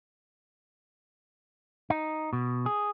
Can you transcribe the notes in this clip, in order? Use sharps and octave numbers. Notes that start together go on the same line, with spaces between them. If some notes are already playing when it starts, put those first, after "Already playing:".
D#4
B2
G#4